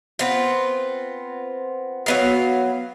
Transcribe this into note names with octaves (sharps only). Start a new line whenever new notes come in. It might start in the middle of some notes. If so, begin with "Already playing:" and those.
B3 C4 F4
F#3 B3 F5